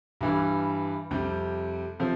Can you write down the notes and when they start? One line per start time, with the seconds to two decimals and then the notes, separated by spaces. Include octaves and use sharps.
0.21 G2 E3 G3
1.11 F2 C3 G3
1.99 C3 F3